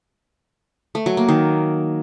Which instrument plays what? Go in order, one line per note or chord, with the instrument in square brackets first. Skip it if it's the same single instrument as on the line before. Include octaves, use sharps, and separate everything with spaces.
[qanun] A3
F#3
A#3
D#3